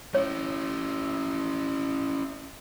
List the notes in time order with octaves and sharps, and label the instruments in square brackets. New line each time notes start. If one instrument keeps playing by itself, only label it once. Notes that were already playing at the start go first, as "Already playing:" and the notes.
[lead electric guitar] C#4 E4 [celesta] C#5